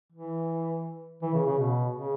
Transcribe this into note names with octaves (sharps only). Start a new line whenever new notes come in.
E3
E3
C#3
C#3
B2
C#3